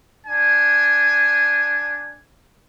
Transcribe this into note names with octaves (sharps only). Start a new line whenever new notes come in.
D4 G#5